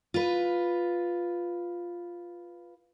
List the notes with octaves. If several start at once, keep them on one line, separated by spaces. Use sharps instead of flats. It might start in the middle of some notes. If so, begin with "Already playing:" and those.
F4 B4